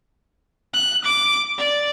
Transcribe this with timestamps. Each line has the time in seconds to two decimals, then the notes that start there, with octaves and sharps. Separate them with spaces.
0.73 F#6
1.04 D6
1.58 D5